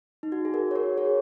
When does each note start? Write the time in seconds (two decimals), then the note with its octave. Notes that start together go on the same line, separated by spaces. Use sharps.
0.23 D#4
0.32 F#4
0.45 G#4
0.54 F#4 A#4
0.71 C#5
0.76 F#4 A#4
0.97 G#4 C#5